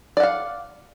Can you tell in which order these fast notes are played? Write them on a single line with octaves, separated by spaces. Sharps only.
D5 F#5 F5